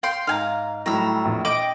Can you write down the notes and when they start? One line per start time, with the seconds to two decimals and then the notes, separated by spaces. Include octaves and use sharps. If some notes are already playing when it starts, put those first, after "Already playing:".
0.03 F5 G5 C6
0.27 G#2 F5 G#5 A#5
0.86 A2 F#3 G3 A#5 E6
1.25 A#1 E2 A2
1.45 D#5 G5 D6 F#7